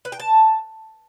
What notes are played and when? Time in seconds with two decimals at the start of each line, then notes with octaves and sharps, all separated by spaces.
0.05 B4
0.12 G5
0.20 A5